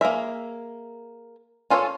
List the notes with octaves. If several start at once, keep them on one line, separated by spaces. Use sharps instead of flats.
A#3 G#4 A#4 E5
C#4 F4 A4 B4 C#5